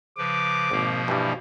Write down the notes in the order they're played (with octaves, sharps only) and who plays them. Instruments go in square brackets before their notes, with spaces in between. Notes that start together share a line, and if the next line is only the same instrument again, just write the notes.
[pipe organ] C#3 F3 B4 [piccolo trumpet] D6
[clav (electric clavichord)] G#1 [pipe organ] B2 F3 A#3
[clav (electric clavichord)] G2 E3 G3